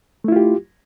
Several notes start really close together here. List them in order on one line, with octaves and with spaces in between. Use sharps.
A3 E4 F4 G4